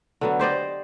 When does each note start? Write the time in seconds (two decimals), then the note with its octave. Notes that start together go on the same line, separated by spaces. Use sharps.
0.21 D3 F#3 B3
0.39 G4 C5 D5 D#5